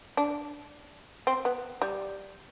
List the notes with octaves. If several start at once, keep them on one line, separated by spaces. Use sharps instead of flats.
D4
C4
B3
G3